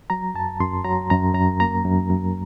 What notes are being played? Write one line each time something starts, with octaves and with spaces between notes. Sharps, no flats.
F#3 A#5
F#2 A5
F#2 C6
F#3 A#5
F#2 A#5
F#2 A#5
A#3 A#5
F#2
F#2